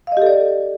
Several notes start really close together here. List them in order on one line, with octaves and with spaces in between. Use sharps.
F5 D#5 G4 A4 D5